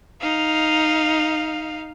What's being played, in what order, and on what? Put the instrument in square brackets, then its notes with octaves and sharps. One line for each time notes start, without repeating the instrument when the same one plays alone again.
[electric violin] D#4 F5